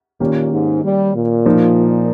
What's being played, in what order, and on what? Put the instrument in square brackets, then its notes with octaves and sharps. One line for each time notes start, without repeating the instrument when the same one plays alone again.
[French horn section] A#2 [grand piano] D#3 A#3 C#4 G4
[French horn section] G#2
G3
A#2
[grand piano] F3 A#3 D#4